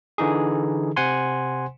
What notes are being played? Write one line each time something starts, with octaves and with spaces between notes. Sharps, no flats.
D3 E3 D#4 G#4
C3 C5 F#5 G#5 C6